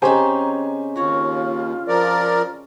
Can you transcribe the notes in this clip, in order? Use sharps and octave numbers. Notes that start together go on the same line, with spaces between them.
C#3 C4 D#4 G4 C5 G#5 A#5
D#2 F4 F#4 C#5
F3 A#4 D5